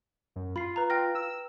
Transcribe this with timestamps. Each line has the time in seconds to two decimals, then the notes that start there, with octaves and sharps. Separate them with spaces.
0.36 F#2
0.56 F4 B5 C7
0.76 B4 A#5
0.90 F4 G5 F6 A#6
1.15 E6